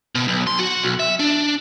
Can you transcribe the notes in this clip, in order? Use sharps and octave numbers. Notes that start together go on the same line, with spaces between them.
B2
B1
C6
F#4
B1
E5
D4